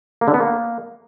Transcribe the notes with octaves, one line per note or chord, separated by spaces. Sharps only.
A#3
D3
B3
A#3